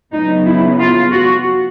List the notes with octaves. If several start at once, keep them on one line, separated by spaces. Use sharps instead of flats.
C#3 F#3 B3 D#4
E4
F4
F#4